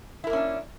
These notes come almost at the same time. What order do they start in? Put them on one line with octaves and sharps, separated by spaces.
E4 A#4 A#3 C#4 D4